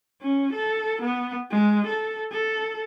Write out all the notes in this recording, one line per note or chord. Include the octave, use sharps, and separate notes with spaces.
C#4
A4
B3
G#3
A4
A4